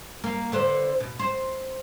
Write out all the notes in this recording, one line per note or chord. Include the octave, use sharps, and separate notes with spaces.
A#3
D3 B4 C5
B2
C5